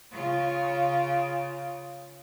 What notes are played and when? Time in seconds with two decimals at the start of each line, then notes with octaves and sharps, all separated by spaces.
0.11 C#3 F4